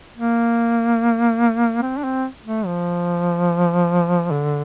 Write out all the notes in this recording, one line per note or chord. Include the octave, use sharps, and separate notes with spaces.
A#3
C4
D4
C4
A3
F3
D3